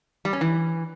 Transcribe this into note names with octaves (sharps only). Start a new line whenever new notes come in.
G3
C#4
E3